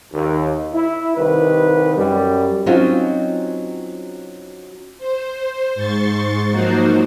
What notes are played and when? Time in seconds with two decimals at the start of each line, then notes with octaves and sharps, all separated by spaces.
0.13 D#2
0.73 E4
1.16 C2 D#3 B4
1.96 F#2 G3
2.66 F#3 C4 C#4 D#4 F4 F#4
4.98 C5
5.75 G#2 C6 C#6 A6
6.49 F3 F#3 A#3 D#4 F#4 C5